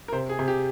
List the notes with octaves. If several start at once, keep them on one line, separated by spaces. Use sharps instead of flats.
A#4
C3 C5
G#4
C3
G4